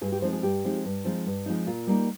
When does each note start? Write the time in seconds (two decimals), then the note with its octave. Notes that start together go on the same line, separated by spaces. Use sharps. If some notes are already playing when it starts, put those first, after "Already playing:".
0.01 G2 G#4
0.12 G4
0.22 F3 G#3 C4 D#4 C5
0.33 G#4
0.43 G2 G4
0.64 F3 G#3 C4 D#4
0.85 G2
1.05 F3 G#3 C4 D#4
1.26 G2
1.46 F3 G#3 C4 D#4
1.67 A#2 F4
1.87 G3 A#3 D#4